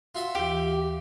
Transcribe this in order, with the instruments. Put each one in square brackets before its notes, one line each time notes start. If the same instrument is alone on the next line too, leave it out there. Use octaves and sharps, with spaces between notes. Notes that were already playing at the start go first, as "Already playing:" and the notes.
[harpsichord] F4 F#4 E5
[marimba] D#2 E3 [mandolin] G4